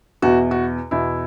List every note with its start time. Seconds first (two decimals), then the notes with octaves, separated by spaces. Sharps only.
0.22 E2 B2 F#4
0.51 F#4
0.91 E2 B2 E4